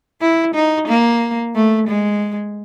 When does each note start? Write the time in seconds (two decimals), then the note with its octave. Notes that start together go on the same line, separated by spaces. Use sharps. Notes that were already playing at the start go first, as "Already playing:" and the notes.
0.21 E4
0.55 D#4
0.88 A#3
1.56 A3
1.88 G#3